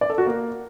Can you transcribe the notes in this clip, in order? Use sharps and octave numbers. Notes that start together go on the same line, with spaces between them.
D5
A4
F#4
A#3